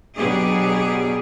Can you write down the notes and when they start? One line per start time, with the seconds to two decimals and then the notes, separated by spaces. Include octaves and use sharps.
0.17 B2 F#3 B3 D4 G4 G#4